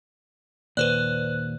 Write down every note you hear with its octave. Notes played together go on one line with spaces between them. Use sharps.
D#2 A#2 B4 C5 D5 F#6